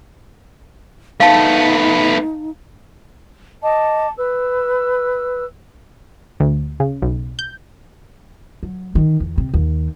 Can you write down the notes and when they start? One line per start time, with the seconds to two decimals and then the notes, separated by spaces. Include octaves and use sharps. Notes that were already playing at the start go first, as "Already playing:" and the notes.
1.20 A3 B3 D#4 F5 A5
3.63 D#5 A5 D6
4.17 B4 E6
6.40 D2
6.80 C#3
7.02 B1
7.39 G6
8.63 F#3
8.95 D#3
9.20 E2
9.38 C3
9.54 D#2